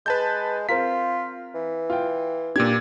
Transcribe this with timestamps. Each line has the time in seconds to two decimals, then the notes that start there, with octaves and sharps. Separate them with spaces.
0.06 G#3 B4 A5 G6
0.69 C4 F4 A#4 B6
1.55 E3
1.90 F4 G5
2.56 A#2 D4 G4 G#6